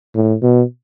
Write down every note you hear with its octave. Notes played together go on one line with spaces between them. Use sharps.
A2
B2